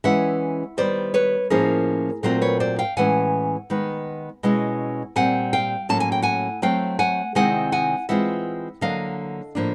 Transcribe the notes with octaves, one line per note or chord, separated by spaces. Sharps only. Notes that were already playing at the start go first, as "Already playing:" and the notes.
E3 G#3 C#4 E4 E5 F#5
D#3 G3 B3 C5 D5
B4 C#5
A2 F3 A#3 C#4 E4 G#4 A#4
A#2 F#3 A3 C4 F4 A#4 C5
B4 C#5
C5 D5
F5 G5
A2 E3 G#3 C#4 F#5 G#5
D#3 G#3 B3
B2 G#3 C#4 E4
A#2 G3 C4 F#5 G#5
F5 G5
A2 F#3 A#3 C#4 A5
G#5
G5
F#5 G#5
F#3 A3 C4 F5 G5
F#5 G#5
C3 D#3 G#3 C4 E4 F#5 G#5
F#5 G#5
E3 G#3 C4 F4 E5 F#5
D3 F#3 A#3 D4 D#5 F5
A2 F3 A#3 D4